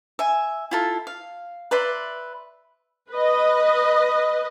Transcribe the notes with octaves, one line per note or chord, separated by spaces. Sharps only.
E5 G#5
E4 F4 A4
F5
B4 D5 E5 C6
B4 D#5